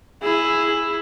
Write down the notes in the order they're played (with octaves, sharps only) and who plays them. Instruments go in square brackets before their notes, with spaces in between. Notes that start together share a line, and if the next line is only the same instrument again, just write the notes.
[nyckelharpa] E4 [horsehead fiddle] G#4